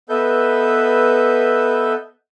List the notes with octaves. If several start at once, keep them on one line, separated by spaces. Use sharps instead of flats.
B3 A4 B4 D#5 E5 G6